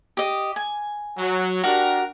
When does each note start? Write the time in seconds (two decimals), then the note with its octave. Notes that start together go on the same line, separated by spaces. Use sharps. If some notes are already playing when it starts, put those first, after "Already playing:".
0.17 G4 D#5
0.56 G#5
1.18 F#3
1.64 D4 F#4 G4 A#4